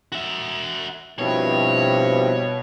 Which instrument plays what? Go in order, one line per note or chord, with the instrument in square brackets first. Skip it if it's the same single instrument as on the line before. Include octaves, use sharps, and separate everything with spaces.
[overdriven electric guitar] F#4 E5
[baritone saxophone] G2 [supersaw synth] B2 [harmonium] F3 C4 E4 [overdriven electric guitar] C#5